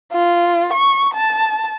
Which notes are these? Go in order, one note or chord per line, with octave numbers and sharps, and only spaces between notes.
F4
C#6
A5